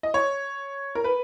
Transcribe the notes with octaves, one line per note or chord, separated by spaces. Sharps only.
D#5
C#5
A#4
B4